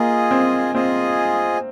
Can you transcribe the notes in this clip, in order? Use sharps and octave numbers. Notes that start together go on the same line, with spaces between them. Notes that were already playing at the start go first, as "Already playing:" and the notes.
Already playing: A#3 F4 G#4 D#5 G#5
C4
C4 F4 G#4 D#5 G#5